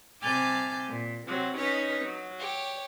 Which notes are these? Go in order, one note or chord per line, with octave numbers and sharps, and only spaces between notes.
C3 G#5 A5 D6 F6 G6
A#2
C3 F#3 C4
C#4 D#4 B4 C#5
F#3
G4 C#5